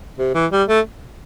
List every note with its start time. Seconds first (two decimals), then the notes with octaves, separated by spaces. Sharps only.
0.18 C3
0.35 E3
0.52 G3
0.68 A3